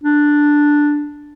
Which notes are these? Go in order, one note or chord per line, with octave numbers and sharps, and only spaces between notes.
D4